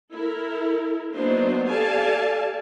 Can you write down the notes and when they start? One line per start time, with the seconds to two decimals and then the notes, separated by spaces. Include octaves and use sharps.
0.12 E4 A4 A#4
1.15 F#3 A#3 B3 D4 D#4 C5
1.68 G4 A4 D5 F5 G#5 A5